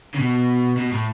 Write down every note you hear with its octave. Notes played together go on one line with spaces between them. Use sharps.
C#3
B2
B2
A2